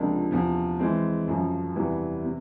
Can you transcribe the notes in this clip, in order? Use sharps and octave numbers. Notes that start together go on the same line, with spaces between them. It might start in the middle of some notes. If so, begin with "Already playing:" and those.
Already playing: C#2 C3 F3 A#3 D4
E2 C3 F3
E3 G#3 C4
F#2 C#3 F3
E2 C3 E3 G3 B3
C3